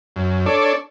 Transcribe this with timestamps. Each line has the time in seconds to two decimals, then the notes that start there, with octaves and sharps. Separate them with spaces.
0.16 F#2
0.46 D4 A4 C#5 D5